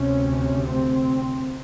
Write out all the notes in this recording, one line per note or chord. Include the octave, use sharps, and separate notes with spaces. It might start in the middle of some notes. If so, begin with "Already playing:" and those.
Already playing: D2 C3 C#4
C4